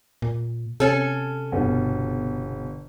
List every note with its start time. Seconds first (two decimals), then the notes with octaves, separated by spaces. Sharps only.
0.22 A#2
0.80 C3 C#4 A4
1.52 G1 B2